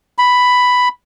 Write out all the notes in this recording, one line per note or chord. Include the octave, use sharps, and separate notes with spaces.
B5